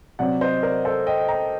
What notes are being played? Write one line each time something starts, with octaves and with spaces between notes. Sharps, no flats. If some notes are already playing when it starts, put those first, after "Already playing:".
C3 F#3 C4 D5 F#5
C5 D#5
A#4 D5
A4 C5
D#5 G5
G5 A#5